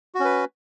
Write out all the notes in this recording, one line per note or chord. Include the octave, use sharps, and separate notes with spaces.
C#4 F#4 B4